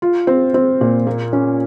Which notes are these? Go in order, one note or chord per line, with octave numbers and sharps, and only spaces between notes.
F4
C4
C4
A#2
A#3
C#4